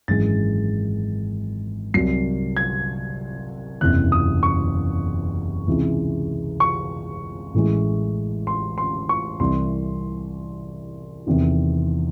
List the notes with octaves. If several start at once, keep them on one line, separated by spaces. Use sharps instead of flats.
G#1 F#2 E3 G#3 A6
C2 C3 F#3 C7
G#6
F#1 E2 C3 E3 F#6
D#6
C#6
C#2 C3 E3 G#3
C#6
A1 A2 E3 G#3
C6
C6
C#6
C2 C3 E3 C6
E2 C3 D#3